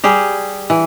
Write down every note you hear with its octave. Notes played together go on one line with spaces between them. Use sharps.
G3 G4 G#4
E3